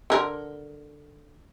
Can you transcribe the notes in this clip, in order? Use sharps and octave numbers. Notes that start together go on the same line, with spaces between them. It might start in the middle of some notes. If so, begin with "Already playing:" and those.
D3 A#4